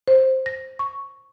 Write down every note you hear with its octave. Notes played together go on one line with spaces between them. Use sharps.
C5
A#6
C#6